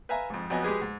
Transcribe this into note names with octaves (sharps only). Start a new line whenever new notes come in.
B4 E5 F5 G#5 A#5
F2 G#2
F2 F#3 B3 D#5 G#5
G#3 G4 G#4 B4
G#2